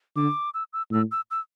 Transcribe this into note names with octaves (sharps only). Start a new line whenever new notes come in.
D3 D6
E6
E6
A2 E6
E6
E6